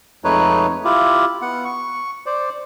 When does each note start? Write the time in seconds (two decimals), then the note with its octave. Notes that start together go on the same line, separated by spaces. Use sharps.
0.24 F2 G#3 A3 D#4 B4 C#5
0.85 E4 F4 G4
1.42 B3 F#5
1.65 C#6
2.26 C5 D5